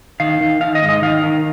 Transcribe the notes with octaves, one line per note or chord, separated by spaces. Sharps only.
D#3 F5
D#3
D#3 F5
D#5
G#2
D#5
D#3 F5
D#3